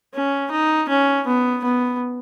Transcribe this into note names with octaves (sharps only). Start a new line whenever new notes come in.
C#4
D#4
C#4
B3
B3